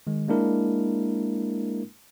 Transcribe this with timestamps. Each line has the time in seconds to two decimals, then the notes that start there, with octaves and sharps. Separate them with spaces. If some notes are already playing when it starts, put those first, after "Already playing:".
0.07 D#3 G#3
0.29 G#3 A#3 D4 E4 A#4